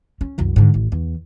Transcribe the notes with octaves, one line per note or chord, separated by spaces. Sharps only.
C#4
C2 F#2
G#2 D3
A1
E2